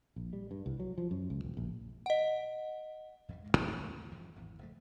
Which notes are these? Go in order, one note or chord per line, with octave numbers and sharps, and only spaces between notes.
A#1
G3
G2
C2
F#3
F3
F#2
C#2
E1
A#1
D#5 F#5
E2 G2 G3
D1 B1 G#2 G#3
D#2 A2 D3 G#3
D#1 F#2 E3 F3
G#1 E2 A2
F#1 F3 A3